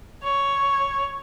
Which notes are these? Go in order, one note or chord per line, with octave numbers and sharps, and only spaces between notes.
C#5